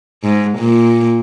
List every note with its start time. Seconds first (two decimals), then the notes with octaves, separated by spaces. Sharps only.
0.23 G#2
0.58 A#2